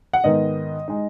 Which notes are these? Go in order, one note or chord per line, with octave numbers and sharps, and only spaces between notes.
F#5
G#2 D#3 B3 D#4 D#5
G#3 D#4